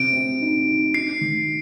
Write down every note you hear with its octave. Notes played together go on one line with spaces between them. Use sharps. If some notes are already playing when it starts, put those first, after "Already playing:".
Already playing: C3 C4 D7
C4
D#4
D#4
D#4 C7
D#3